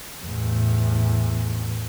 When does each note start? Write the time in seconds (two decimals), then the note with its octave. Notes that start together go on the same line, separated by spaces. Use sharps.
0.23 E2 A2